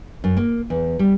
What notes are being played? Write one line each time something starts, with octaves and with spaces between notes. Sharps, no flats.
F#2
A#3
E2
G3